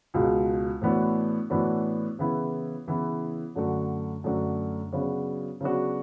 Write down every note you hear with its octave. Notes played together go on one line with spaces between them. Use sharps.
C#2 B2 G#3
A2 E3 B3 D4 F#4
A2 E3 B3 D4 F#4
C#3 E3 B3 E4
C#3 E3 B3 E4
F#2 D3 A3 D4 F#4
F#2 D3 A3 D4 F#4
C#3 F#3 B3 D4 F#4
C#3 F#3 B3 D4 F#4